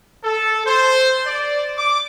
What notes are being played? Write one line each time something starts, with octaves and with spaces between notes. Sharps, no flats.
A4
C5
D5
D6